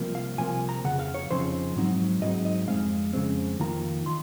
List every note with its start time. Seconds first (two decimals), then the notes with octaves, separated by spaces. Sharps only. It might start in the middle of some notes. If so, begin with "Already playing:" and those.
Already playing: C2 C3 F3 A#3
0.15 F5
0.38 C2 C3 F3 A#3 G#5
0.69 A#5
0.84 F2 C#3 F#5
0.99 F5
1.14 C#5
1.30 F2 C#3 F3 C4 D#4 C5
1.76 G#2 F#3 C4 D#4
2.22 G#2 F#3 C4 D#4 D#5
2.45 D#5
2.68 F2 C#3 G#3 C4 F5
3.13 F2 C#3 G#3 C4
3.60 F2 D#3 A#3 F4 A#5
4.06 D#3 C6